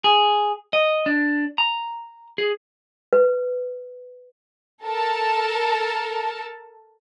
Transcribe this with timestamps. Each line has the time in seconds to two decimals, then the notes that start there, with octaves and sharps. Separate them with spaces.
0.04 G#4
0.73 D#5
1.06 D4
1.58 A#5
2.38 G#4
3.13 B4
4.85 A4 A#4 A5